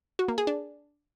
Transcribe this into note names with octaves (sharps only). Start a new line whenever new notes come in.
F#4
A#3
G#4
D4